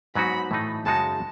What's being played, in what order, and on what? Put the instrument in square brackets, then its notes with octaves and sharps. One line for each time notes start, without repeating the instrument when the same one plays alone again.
[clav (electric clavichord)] G#2 F#3 B3 D#4 F#4 [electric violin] B5
[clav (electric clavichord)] A2 E3 A3 D#4
[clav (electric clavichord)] F#2 C#3 G#3 D#4 F#4 [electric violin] A5